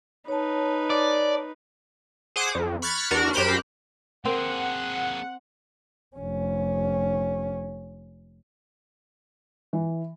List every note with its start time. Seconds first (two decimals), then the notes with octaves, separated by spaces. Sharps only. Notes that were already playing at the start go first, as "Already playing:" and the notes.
0.28 D#4 B4 C#5 A5
0.90 D5
2.36 G#4 C5 F#5 D6 D#6
2.55 F2
2.82 B5 C#6 F6 F#6 G#6 A6
3.11 E2 D4 F#4 A#4 F6
3.33 F#2 G4 A#4 C5 B5 F#6
4.25 A#3 C4 G#4 A#4 F#5
6.16 F1 C#4
9.73 E3